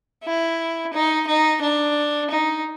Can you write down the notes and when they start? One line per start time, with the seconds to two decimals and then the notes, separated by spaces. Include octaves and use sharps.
0.24 E4
0.93 D#4
1.27 D#4
1.61 D4
2.30 D#4